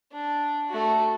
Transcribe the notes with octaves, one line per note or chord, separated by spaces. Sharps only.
D4
A3 F#4